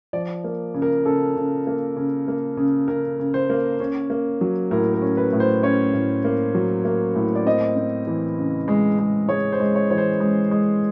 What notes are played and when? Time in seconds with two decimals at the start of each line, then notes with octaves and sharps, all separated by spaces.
0.13 F3 D5
0.44 A#3
0.74 C#3
0.82 A#4
1.05 C#3 A4
1.36 C#3
1.67 A#3
1.97 C#3
2.28 A#3
2.57 C#3
2.88 C#3 A#4
3.19 C#3
3.34 C5
3.50 A#3
3.80 C#4
4.10 A#3
4.41 F#3
4.71 A2 A#4
4.94 A#4
5.02 C#4
5.17 B4
5.33 A2
5.40 C5
5.63 C#4 C#5
5.94 A2
6.25 A#3
6.55 F#3
6.85 A#3
7.15 A2
7.35 D5
7.45 C4 D#5
7.76 C4
8.07 E3
8.38 C#3
8.68 G#3
8.99 G#3
9.29 G#3 C#5
9.53 C5
9.60 G#3
9.75 C#5
9.91 E3 C#5
9.98 C5
10.20 G#3
10.51 G#3